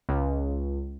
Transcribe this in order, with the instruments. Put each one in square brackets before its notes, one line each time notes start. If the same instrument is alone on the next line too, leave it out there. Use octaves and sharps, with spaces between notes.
[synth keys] C#2